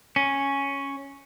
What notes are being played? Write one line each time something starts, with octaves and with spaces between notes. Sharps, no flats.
C#4